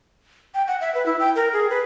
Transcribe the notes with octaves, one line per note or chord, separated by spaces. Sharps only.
G5
F#5
E5
B4
E4
G5
A#4
G#4
B4